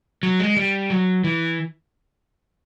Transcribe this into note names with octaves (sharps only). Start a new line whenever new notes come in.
F#3
G#3
G3
F#3
E3